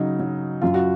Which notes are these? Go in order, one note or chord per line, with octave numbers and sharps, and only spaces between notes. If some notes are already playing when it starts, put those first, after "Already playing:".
Already playing: C#3 F#3 D#4
F#3
F#2 F4
F#4